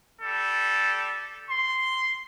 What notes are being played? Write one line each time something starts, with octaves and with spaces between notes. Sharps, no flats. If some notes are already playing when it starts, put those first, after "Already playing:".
G3 A4
C6